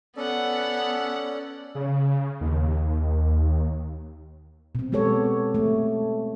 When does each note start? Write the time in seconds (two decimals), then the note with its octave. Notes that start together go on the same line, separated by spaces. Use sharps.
0.16 B3 C#4 A4 D5 F#5
1.75 C#3
2.41 D#2
4.75 B2 C4
4.92 G#3 B3 G4 A4 C#5
5.55 A3